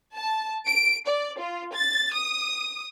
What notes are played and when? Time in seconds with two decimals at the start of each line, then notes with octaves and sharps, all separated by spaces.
0.16 A5
0.65 D7
1.07 D5
1.38 F4
1.73 A6
2.13 D#6